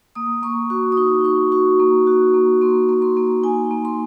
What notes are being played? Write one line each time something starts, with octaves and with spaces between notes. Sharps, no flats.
A#3 D#6
A#3 C#6
F#4 C#6
D#6
D#4 C#6
D#4 C#6
F#4 C#6
A#3
F#4
A#3
A#3 C6
A#3
C6
A#3
D#4 G#5
A#3
C6